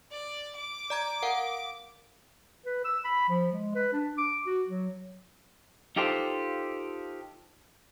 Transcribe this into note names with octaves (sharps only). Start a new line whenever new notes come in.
D5
D6
D5 A#5 G#6
A#4 F5 F#5
B4
E6
B5
F3
G#3
B4
D4
D6
F#4
F#3
D#4 F4 G4 A4 C5